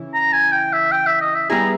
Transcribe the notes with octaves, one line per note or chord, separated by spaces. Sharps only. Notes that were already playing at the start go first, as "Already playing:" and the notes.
Already playing: C#3 E3 E4
A#5
G#5
G5
E5
G5
E5
D#5
E5
G3 B3 E4 G#4 A#5